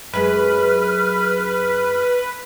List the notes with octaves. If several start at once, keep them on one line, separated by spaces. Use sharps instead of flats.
F#2 G#3 B4 F6